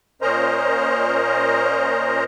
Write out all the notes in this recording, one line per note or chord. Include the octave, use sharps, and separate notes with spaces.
A#2 C#4 A#4 C5 D#5 A#5